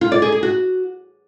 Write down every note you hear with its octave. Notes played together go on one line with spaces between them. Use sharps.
F4
D5
G#4
G#4
F#4